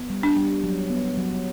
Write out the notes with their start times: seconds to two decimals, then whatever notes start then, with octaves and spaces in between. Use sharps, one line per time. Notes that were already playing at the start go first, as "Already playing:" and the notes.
Already playing: B3
0.10 G3
0.23 D4
0.36 G3
0.64 F#3
0.90 B3
1.17 F#3